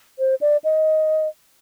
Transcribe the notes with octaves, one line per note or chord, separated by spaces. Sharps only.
C5
D5
D#5